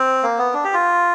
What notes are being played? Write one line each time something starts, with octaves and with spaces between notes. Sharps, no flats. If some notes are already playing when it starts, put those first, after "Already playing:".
Already playing: C4
A#3
B3
D4
G4
F4